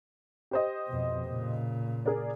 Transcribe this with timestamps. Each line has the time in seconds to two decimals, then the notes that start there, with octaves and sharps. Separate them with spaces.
0.51 G4 C5 D#5
0.87 F2 B2
1.28 A#2 C#3
2.06 G#4 A#4 D5